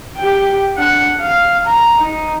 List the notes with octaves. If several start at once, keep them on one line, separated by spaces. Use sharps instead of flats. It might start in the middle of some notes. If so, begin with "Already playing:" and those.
G4 G5
D4 F#5
F5
A#5
D#4